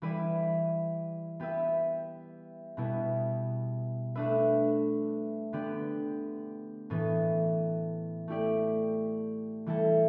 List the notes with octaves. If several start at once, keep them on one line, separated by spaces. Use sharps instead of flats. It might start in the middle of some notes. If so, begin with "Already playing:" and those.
E3 G3 E4 B4 D5
B3 G4 B4 E5
B2 G3 B3 E4
A3 D4 B4 E5
D3 B3 G4 D5
A2 E3 B3
A3 E4 G4 D5
E3 G3 E4 A4